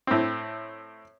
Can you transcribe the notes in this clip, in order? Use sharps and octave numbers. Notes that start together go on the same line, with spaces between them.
A2 C4